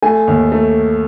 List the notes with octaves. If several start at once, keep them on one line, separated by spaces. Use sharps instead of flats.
A3 G#5
D#2
A3